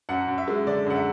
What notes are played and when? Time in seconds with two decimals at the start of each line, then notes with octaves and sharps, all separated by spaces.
0.09 F#2 F#5
0.28 F#2
0.38 E5
0.48 G#3
0.67 D3 D5
0.86 F#2 F#5
0.96 E5